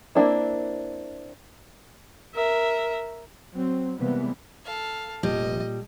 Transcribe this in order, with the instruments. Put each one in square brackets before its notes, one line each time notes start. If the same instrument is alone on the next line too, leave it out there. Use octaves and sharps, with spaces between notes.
[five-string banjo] A#3 C4 D4 E4
[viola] A#4 E5
[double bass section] F#3 C4
C3 E3 G3 G#3 A#3 B3
[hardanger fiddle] A4 F5
[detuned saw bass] F1 [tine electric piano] A#2 [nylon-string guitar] G3 [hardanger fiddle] D#5